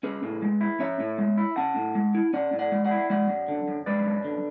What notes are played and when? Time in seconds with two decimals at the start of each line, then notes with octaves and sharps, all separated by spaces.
0.03 C#4 G#4 B4
0.23 A2
0.42 G#3
0.61 E4
0.80 C#4 C#5 E5
1.00 A2
1.18 G#3
1.38 E4
1.56 C#4 F#5 A5
1.76 A2
1.95 G#3
2.15 E4
2.33 C#4 D5 F#5
2.53 A2
2.59 D5 F#5
2.72 G#3
2.84 D5 F#5
2.91 E4
3.10 G#3 D5 F#5
3.29 F#2
3.48 D3
3.68 F#2
3.86 G#3 B4 D5
4.06 F#2
4.25 D3